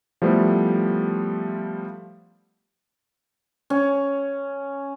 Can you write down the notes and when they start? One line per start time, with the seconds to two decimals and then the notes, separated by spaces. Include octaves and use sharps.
0.22 F3 G3 A3 B3 E4 C5
3.70 C#4